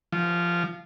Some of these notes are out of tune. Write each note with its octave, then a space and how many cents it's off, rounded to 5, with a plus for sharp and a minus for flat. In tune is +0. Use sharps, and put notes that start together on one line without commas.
F3 -15